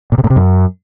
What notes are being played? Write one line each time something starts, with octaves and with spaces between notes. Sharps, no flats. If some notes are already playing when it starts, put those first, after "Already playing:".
A#2
C3
A2
C3
F#2